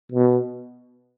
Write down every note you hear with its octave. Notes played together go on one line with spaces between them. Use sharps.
B2